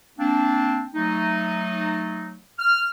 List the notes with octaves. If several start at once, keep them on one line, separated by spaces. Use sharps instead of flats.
A#3 C4 D4
F#3 A3 D#4
F6